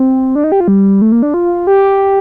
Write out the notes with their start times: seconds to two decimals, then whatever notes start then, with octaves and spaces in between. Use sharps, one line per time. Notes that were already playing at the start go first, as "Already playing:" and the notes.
Already playing: C4
0.35 D4
0.44 D#4
0.52 G4
0.60 F4
0.68 G3
1.02 A3
1.12 A#3
1.22 D4
1.34 F4
1.67 G4